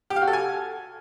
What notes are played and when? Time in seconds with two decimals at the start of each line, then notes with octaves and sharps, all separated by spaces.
0.10 G4
0.16 F5
0.22 F#4
0.27 A4
0.33 G#5